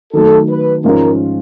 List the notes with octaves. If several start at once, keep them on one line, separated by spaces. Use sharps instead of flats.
D#3 F#3 A3 A4
B4
G#2 F3 G#3 C#4 F4 A#4